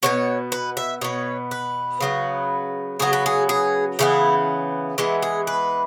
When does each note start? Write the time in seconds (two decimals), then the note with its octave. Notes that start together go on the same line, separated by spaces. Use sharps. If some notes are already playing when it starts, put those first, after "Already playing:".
0.03 B2 F#3 B3 C#5
0.52 B4
0.77 E5
1.01 B2 B3 C#5
1.51 B4
2.00 C#3 F#3 B3
2.99 C#3 F#3 B3 G#4
3.13 B4
3.26 G#4
3.49 G#4
3.99 C#3 E3 B3 E4
4.98 E3 G#3 B3 E4
5.22 G#4
5.47 B4